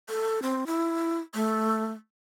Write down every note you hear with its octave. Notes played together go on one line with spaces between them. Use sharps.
A4
C4
E4
A3